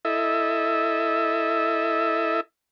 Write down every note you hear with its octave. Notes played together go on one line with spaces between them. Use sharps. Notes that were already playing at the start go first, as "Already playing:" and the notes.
E4 A4 D#5 E5